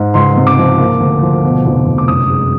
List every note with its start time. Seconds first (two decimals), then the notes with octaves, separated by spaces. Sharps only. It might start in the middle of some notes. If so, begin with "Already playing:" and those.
Already playing: G#2
0.14 C#2 C6
0.36 C3
0.47 D6
0.58 F3
0.78 A#3
1.00 D2
1.22 F3
1.44 B2
1.65 F1
1.86 F1
1.98 D6
2.08 F#2 D#6
2.30 G#3